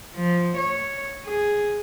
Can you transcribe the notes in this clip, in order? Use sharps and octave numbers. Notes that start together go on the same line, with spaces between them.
F3
C#5
G#4